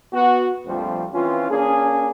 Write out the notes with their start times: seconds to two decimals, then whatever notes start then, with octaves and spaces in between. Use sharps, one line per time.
0.13 B3 F#4
0.66 A#1 F2 F3 G3 A3 C4
1.13 E3 C4 C#4 F4
1.50 A#3 C#4 D4 G#4